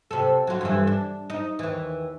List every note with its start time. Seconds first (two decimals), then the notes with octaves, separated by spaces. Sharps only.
0.11 C3 A4
0.47 F#3 F4
0.61 G2 D3 E3
0.87 D4
1.30 D#4
1.59 D#2 E3